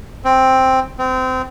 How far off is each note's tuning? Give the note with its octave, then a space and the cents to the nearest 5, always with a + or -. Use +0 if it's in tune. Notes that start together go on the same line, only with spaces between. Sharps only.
C4 +5
C4 -25